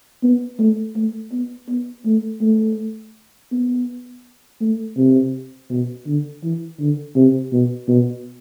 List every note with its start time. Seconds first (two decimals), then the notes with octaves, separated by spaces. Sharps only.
0.23 B3
0.59 A3
0.96 A3
1.32 B3
1.69 B3
2.05 A3
2.42 A3
3.52 B3
4.61 A3
4.97 C3
5.70 B2
6.07 D3
6.44 E3
6.79 D3
7.16 C3
7.53 B2
7.88 B2